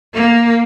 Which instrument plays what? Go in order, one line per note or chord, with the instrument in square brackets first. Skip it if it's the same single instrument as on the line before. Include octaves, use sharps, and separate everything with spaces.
[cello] A#3